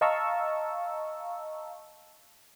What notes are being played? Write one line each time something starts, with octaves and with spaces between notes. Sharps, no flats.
D#5 F5 A5 A#5 C#6 E6